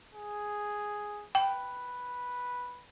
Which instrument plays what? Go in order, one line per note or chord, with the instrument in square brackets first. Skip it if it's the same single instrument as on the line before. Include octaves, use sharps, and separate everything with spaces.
[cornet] G#4
[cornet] B4 [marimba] G5